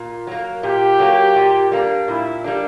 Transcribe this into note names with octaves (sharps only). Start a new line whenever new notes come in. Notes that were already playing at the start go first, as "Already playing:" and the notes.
Already playing: A#2
F#3 A#3 A#4
A#2 G4
F#3 A#3
A#2
G3 A#3 D4
A#2 E4
G3 A#3 D4